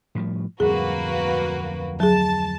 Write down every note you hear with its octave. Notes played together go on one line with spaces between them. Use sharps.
A2 F3 G3
D1 F2 G3 A#3 F#4 G#4 B4
F#3 G#4 A5